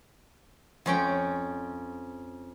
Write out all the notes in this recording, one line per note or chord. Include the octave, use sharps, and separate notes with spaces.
F2 C#4 G5